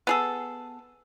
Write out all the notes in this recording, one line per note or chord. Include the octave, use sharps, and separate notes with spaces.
B3 G#4 A4